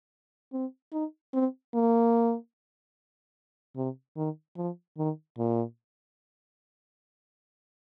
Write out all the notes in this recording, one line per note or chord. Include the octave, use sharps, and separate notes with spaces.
C4
D#4
C4
A#3
C3
D#3
F3
D#3
A#2